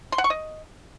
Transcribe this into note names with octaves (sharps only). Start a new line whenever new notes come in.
C6
F#5
C#6
D#5